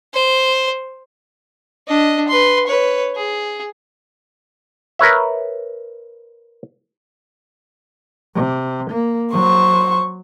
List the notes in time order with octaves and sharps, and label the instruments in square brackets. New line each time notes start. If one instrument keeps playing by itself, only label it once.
[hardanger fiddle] C5
[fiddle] D4 D#5
B4 C6
B4 C#5
G#4
[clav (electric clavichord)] A#4 B4 C#5 E5
[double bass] C3
A#3
[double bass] F#3 [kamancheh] C5 C#6